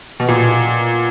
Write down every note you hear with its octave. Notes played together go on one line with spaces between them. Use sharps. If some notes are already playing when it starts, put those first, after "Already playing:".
B2
A#2